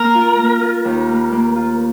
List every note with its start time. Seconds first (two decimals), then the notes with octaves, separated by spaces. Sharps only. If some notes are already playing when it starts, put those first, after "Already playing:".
Already playing: A#3 A#4
0.15 F4
0.38 A#3
0.62 F4
0.85 D#2
1.09 A#3
1.32 A#3
1.56 F4